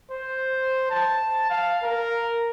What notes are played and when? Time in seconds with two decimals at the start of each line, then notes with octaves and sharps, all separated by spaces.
0.11 C5
0.90 A5
1.50 F5
1.83 A#4